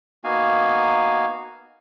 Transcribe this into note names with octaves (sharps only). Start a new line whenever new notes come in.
A#3 B3 D#4 F#4 F5 G#5